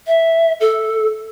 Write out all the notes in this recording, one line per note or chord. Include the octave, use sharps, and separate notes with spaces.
E5
A4